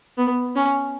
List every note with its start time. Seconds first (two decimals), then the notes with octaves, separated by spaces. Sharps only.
0.18 B3
0.56 C#4